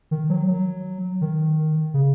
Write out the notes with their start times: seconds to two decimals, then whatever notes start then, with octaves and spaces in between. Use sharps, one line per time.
0.11 D#3
0.29 F#3
0.47 F#3
1.21 D#3
1.94 C#3